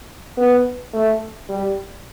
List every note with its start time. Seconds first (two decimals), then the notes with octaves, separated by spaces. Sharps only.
0.37 B3
0.93 A3
1.49 G3